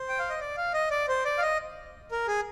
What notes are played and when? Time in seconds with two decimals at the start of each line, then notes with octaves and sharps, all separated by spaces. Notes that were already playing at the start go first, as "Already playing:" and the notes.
Already playing: C5
0.09 G5
0.19 F5
0.29 D#5
0.41 D5
0.57 F5
0.74 D#5
0.91 D5
1.08 C5
1.25 D5
1.38 F5
1.42 D#5
2.11 A#4
2.28 G#4